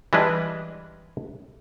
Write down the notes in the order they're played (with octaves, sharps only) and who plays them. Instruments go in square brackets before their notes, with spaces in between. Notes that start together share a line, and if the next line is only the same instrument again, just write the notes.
[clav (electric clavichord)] E3 G3 G#3 D4 B4